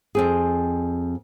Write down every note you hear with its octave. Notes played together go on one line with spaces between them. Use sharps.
F2 C4 G#4